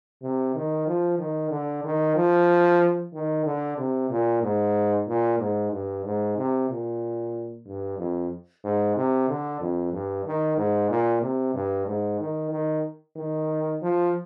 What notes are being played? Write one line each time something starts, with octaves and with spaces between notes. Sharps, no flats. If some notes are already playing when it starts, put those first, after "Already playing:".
C3
D#3
F3
D#3
D3
D#3
F3
D#3
D3
C3
A#2
G#2
A#2
G#2
G2
G#2
C3
A#2
G2
F2
G#2
C3
D3
F2
G2
D#3
G#2
A#2
C3
G2
G#2
D#3
D#3
D#3
F3